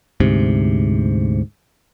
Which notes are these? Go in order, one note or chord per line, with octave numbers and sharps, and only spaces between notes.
D2 G#2 C3